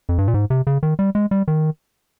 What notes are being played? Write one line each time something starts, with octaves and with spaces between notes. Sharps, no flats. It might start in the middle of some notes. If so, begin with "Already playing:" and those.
F2
G2
A#2
G#2
C3
C#3
D#3
G3
G#3
G3
D#3